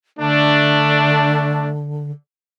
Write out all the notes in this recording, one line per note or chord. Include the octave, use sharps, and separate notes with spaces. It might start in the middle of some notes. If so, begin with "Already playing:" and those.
D3 A3 D4